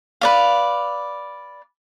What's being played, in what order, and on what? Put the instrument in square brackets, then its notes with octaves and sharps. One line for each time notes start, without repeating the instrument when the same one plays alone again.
[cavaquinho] B4 D5 F5